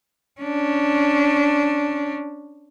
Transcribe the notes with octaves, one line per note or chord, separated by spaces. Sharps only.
C#4 D4